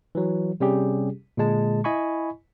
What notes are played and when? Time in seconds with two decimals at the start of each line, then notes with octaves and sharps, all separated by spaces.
0.15 E3 F#3
0.60 C3 G3 C#4 G4 G#4
1.37 A#2 D3 G#3 A5
1.84 E4 D#5 G#5 B5 C#6